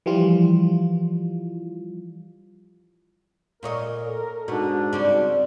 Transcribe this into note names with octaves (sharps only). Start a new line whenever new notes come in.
E3 F3 G3 F4
A#2 A#4 C#5 D#5
A4
G#2 B2 D4 F#4
C#3 G3 C4